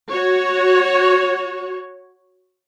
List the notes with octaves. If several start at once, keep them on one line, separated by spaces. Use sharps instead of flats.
F#4 C#5